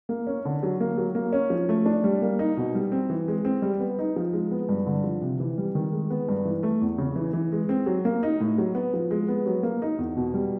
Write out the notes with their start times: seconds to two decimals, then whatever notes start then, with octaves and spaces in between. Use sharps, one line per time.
0.09 A#3
0.27 C#4
0.45 D3
0.63 F#3
0.80 A#3
0.98 F#3
1.15 A#3
1.33 C#4
1.50 F3
1.69 A3
1.86 D4
2.04 G3
2.22 A#3
2.39 D#4
2.57 B2
2.75 G3
2.92 C4
3.10 E3
3.28 G#3
3.45 C4
3.62 G3
3.80 B3
3.99 D#4
4.16 F3
4.33 G#3
4.51 B3
4.69 G2
4.87 D3
5.04 F3
5.22 C3
5.40 E3
5.58 G3
5.75 D#3
5.93 G#3
6.10 B3
6.28 G2
6.45 E3
6.63 A3
6.82 E2
6.98 C#3
7.16 E3
7.33 E3
7.52 G#3
7.69 C4
7.86 F#3
8.05 A#3
8.23 D#4
8.40 A2
8.58 F#3
8.75 B3
8.94 F3
9.11 G#3
9.28 B3
9.46 F#3
9.63 A#3
9.82 D#4
9.98 E2
10.16 B2
10.34 G3